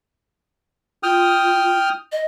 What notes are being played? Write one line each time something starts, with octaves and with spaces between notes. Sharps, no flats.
F4 G5 D#6 F6
D#5